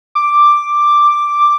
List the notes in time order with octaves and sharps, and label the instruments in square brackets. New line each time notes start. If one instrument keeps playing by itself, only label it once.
[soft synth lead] D6